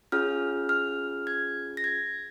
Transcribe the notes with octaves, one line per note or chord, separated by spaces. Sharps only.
C#4 F4 G#4 F6
F6
G#6
A#6
G#6